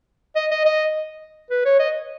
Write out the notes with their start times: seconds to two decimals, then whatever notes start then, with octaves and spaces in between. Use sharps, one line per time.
0.36 D#5
0.51 D#5
0.65 D#5
1.50 B4
1.65 C#5
1.79 D#5